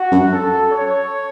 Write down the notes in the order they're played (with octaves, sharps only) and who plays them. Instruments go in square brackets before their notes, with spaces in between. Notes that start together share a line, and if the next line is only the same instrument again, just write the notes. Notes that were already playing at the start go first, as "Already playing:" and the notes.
Already playing: [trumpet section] F#4
[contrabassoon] F#2
[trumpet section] A4
C#5